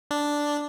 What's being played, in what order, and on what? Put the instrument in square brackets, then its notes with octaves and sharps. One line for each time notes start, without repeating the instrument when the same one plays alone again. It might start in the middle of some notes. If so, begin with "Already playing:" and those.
[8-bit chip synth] D4